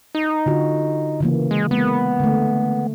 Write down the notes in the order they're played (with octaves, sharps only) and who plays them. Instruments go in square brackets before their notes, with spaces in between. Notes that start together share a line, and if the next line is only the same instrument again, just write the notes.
[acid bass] D#4
[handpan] D3 F4 F#4
C#3 E3 A#3
[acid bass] G#3
[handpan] G#3 A#3 [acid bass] B3
[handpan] D3 A3